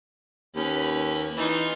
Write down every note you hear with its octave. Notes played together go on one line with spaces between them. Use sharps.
D#2 C#4 B4
E3 D#4 F4